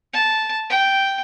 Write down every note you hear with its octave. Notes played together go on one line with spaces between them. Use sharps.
A5
G5